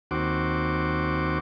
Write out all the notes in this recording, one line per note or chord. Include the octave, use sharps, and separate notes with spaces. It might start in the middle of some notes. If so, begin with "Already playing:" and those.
D#2 C4 F#4 D6